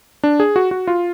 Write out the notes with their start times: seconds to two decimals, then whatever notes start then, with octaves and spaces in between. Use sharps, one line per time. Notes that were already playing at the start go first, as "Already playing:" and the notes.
0.23 D4
0.40 G#4
0.56 F#4
0.71 F#4
0.87 F4